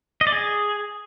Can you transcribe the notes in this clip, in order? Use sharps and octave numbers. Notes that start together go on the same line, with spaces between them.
D#5
D5
G#4